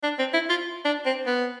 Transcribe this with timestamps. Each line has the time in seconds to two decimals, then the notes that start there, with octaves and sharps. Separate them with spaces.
0.04 D4
0.19 C4
0.34 E4
0.50 F4
0.85 D4
1.06 C4
1.27 B3